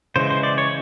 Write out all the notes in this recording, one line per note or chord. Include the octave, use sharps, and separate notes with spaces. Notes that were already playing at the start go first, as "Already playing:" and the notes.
C#3 E3 G#3 C5
C5
D5
C#5